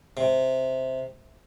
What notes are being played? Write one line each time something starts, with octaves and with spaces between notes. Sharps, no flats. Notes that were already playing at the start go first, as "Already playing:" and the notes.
C3